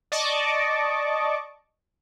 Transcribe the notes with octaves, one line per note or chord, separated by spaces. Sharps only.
D5 D#5 A5 C#6 D6